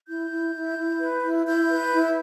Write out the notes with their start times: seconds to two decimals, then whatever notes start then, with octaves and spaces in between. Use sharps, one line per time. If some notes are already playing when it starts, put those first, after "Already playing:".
0.08 E4 G6
0.32 E4
0.55 E4
0.78 E4
1.00 B4
1.24 E4
1.46 E4 G6
1.69 B4
1.92 E4